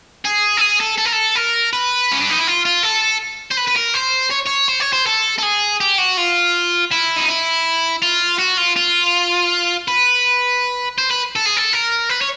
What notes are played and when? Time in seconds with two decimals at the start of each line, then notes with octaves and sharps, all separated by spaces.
0.25 G#4
0.57 A4
0.61 G#4
0.80 A4
0.98 A4
1.06 A#4
1.13 A4
1.36 A#4
1.73 B4
2.12 C#4
2.20 D4
2.29 D#4
2.38 E4
2.47 F4
2.65 F4
2.83 A4
3.51 C5
3.58 B4
3.68 B4
3.76 A#4
3.95 C5
4.31 C#5
4.47 C#5
4.69 C5
4.80 C#5
4.93 C5
5.07 A4
5.39 A4
5.43 G#4
5.80 G4
5.98 F#4
6.17 F4
6.92 E4
7.16 D#4
7.28 E4
8.03 F4
8.39 F#4
8.57 F4
8.76 F4
9.88 B4
10.98 C5
11.11 B4
11.36 A4
11.46 G#4
11.57 A4
11.73 A#4
12.09 B4
12.21 C#5